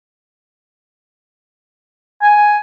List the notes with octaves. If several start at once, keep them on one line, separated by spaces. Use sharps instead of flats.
G#5